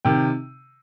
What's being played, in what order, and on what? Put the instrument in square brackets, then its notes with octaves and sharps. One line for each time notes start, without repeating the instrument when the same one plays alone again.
[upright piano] C3 D#3 G5